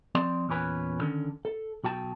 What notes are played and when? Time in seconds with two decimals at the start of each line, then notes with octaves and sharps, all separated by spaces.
0.15 F3 C4 D5 C6
0.49 E2 A#2 C#4 B4 G#5
1.00 D3 D#3 C#4
1.45 A4
1.84 B1 F#4 G5 A5